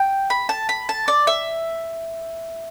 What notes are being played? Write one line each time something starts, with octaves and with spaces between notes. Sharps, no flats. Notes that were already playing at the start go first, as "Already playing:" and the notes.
Already playing: G5
B5
A5
B5
A5
D5
E5